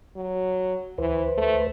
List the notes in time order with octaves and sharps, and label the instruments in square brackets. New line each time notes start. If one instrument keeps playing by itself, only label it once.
[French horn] F#3
[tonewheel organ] D2 B4 C5 [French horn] E3
[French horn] A3